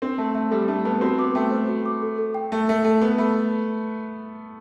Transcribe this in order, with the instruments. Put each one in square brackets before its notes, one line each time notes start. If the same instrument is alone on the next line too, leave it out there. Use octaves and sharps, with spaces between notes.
[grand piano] C4 [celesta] D4
[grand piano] A3 [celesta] A5
[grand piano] A3 [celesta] E5
[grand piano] G3 [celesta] A4
[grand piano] A3 [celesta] D4
[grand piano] B3 [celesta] A5
[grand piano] C4 [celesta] F#4
[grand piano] B3 [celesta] D6
[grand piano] A3 [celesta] G5
[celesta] C5
F#4
D6
A4
A4
G5
[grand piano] A3 [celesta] E5
[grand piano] A3 [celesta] A4
[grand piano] A3 [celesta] A4
[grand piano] B3 [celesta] B4
[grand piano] A3 [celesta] B5